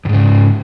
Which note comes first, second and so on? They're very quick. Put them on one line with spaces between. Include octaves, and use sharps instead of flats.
E2 G#2 C#3